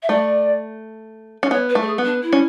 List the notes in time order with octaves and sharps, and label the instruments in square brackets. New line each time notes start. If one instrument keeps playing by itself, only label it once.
[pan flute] E5
[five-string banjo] A3 [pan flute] D5
[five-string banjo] C#4
[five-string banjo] B3 [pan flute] C#5
[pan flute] B4
[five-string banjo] A3
[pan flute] A4
G#4
[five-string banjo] B3
[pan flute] D4
E4
[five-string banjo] C#4